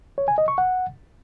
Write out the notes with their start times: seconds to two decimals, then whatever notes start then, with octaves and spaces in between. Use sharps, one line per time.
0.18 C#5
0.28 G#5
0.38 D#5
0.48 C#6
0.58 F#5